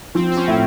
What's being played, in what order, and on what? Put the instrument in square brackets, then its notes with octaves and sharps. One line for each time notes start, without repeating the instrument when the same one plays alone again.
[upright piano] F3 [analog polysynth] C4
[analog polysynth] C4
C#4
[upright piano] A2 [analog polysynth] C4